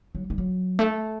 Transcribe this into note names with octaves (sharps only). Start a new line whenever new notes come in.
F#3
G3
F#3
A3